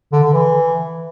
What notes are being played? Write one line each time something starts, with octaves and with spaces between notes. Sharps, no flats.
D3
D3
E3